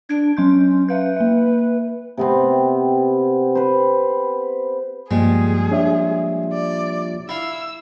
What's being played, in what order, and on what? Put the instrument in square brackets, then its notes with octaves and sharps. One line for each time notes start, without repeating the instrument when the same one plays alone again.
[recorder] D4 [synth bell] G#6 D7
[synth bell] F#3 C6 G6 [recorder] C#4
[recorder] B4 [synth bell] E5 F5 G6
[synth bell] A#3 E5
[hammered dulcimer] C3 B3 C4
B4 C5
[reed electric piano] G2 [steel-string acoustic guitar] A#2 F3 G3 [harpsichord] G#3 [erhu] G#4
[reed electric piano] D4 C#5 E5
[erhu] D5
[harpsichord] E4 F5 [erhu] E6